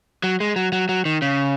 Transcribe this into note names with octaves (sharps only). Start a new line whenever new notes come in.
F#3
G#3
F#3
F#3
F#3
D#3
C#3